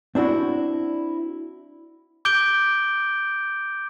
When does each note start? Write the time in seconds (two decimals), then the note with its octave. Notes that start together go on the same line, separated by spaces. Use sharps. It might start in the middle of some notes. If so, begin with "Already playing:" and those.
0.15 C4 D4 E4 F#4
2.25 D6 G6 D7 G7